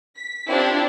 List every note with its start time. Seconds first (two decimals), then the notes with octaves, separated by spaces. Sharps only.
0.16 B6
0.48 C4 D4 E4 F4 G4